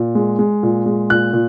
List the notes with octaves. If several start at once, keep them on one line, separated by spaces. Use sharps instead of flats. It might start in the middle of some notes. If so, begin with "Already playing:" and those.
Already playing: A#2
G#3
G#3
A#2
G#3
A#2 F#6
A#2